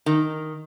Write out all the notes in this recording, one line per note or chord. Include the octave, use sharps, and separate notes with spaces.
D#3